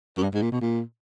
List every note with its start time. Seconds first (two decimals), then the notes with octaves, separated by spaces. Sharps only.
0.17 F#2
0.23 G2
0.34 G#2
0.42 A#2
0.52 B2
0.61 A#2